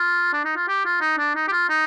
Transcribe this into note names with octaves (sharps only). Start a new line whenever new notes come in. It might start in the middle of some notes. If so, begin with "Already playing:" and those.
Already playing: F4
D4
D#4
F4
G4
F4
D#4
D4
D#4
G4
F4
D#4